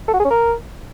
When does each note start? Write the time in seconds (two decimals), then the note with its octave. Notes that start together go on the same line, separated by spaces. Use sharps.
0.08 A4
0.14 F#4
0.19 G#4
0.25 C#4
0.31 A#4